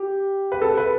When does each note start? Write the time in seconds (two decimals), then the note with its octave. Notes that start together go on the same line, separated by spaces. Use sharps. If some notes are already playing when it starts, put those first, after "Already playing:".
Already playing: G4
0.52 B4
0.62 A4
0.77 B4